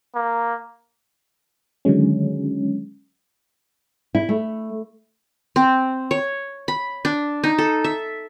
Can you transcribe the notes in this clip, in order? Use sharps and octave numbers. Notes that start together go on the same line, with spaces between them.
A#3
D3 D#3 F#3 G#3 C#4
E4
A3
C4
C#5
B5
D4
D#4
A4
E5